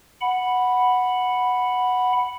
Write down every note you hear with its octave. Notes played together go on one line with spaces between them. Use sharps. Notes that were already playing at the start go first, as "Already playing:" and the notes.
F#5 B5